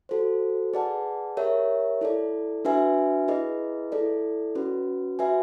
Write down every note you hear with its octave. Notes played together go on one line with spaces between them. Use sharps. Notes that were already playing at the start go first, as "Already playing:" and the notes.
F#4 A4 C5
G#4 B4 D5 F#5 A5
G4 A#4 C#5 E5
E4 A4 D5
D4 F#4 B4 E5 G#5
E4 G#4 B4 D#5
E4 A4 D5
C#4 F#4 B4
F#4 B4 E5 G#5